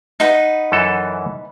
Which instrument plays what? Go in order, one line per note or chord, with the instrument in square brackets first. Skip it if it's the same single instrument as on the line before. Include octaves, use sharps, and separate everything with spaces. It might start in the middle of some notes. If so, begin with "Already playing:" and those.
[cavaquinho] D#4 B4 F#5
[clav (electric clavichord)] F#2 E3 A4